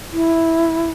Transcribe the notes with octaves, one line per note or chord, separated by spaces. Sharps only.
E4